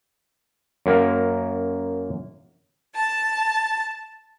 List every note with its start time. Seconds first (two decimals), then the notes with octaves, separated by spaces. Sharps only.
0.86 F#2 A#3 A#4
2.95 A5